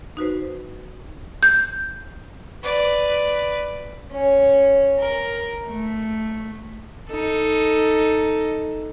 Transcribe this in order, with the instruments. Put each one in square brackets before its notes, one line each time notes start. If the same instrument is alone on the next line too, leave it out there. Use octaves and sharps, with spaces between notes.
[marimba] D#4 F#4 B4 C5
[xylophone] G6
[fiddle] B4 D5
[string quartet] C#4
A#4
A3
[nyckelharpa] D#4 A4